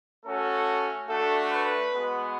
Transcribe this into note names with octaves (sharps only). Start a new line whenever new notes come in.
A3 C#4 F#4 A4
A3 D4 F#4 A4
B4
G#3 B3 F#4